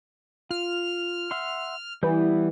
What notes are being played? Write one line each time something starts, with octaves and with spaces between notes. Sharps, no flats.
F4 F6
E5 F#5 C6
E3 G3 B3 G6